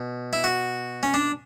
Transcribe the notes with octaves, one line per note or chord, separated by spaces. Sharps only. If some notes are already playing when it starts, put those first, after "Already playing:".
Already playing: B2
E4
F#4
C#4
D4